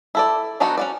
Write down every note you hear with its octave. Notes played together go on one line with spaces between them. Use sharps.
E4 A4 D5
F#3 B3 D4 D#4 F#4
C#4 F#4 D5